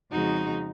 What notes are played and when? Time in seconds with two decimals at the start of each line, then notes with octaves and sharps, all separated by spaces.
0.11 F2 C#3 G#3 D#4 F#4